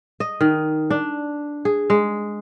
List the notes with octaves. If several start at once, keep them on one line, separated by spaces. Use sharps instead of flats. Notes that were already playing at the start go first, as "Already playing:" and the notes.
D#5
D#3
D4
G#4
G#3